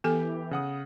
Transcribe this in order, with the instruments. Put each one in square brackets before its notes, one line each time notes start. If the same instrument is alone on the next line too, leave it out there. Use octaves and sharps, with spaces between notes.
[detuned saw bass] E3 [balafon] B3 A4 G#5 [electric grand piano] G4
[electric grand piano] C#3 F#5 D#6